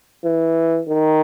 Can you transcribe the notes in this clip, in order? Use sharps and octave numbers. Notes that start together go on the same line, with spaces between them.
E3
D#3